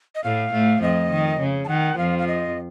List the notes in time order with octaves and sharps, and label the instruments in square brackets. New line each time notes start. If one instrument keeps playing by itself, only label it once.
[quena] D#5
[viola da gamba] A2 A3 [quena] F5
[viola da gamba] A2 A3
[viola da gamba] F2 F3 [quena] D#5
[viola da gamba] D#3
C#3
[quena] A5
[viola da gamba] D#3 [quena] F#5
[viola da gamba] F2 F3 [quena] F5
[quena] F5
D#5